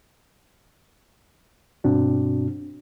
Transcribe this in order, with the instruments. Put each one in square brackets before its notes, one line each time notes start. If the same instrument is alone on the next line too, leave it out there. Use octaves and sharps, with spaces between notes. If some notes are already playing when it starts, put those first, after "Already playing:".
[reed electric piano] G2 B2 C4 D4 F#4